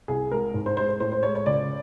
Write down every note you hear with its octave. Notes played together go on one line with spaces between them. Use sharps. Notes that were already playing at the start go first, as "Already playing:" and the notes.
C2 G#4
G#3 A#4
G#2
C5
G#3 C5
C5
A2 C5
C5
G#3 C#5
C#5
C#2 D5